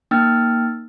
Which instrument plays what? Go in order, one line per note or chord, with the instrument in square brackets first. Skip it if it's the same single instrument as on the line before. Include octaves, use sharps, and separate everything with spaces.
[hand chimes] A#3 D#4 G5 E6 F6 A6